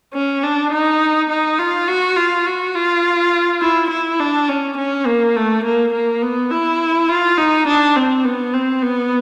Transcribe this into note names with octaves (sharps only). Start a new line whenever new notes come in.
C#4
D4
D#4
D#4
F4
F#4
F4
F#4
F4
E4
E4
D4
C#4
C#4
A#3
A3
A#3
A#3
B3
E4
F4
D#4
D4
C4
B3
C4
B3